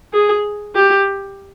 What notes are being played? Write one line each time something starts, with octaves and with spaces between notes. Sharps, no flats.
G#4
G4